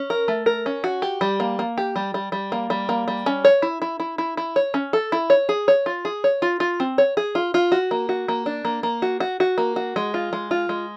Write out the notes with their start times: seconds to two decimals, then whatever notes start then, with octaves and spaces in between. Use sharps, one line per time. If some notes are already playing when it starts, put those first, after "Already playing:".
Already playing: C#4
0.10 A#4
0.28 A3
0.46 A#4
0.66 C#4
0.84 F#4
1.02 G4
1.21 G3
1.40 A#3
1.59 A#3
1.78 G4
1.96 G3
2.14 G3
2.32 G3
2.52 A#3
2.70 G3
2.89 A#3
3.08 G3
3.26 C#4
3.45 C#5
3.62 E4
3.82 E4
4.00 E4
4.18 E4
4.37 E4
4.56 C#5
4.74 C#4
4.93 A4
5.12 E4
5.30 C#5
5.49 G#4
5.68 C#5
5.86 F4
6.05 G#4
6.24 C#5
6.42 F4
6.60 F4
6.80 C4
6.98 C#5
7.17 G#4
7.35 F4
7.54 F4
7.72 F#4
7.91 A#3
8.09 F#4
8.28 A#3
8.46 D4
8.65 A#3
8.83 A#3
9.02 F#4
9.20 F#4
9.40 F#4
9.58 A#3
9.76 F#4
9.96 G#3
10.14 F4
10.33 G#3
10.51 F4
10.69 G#3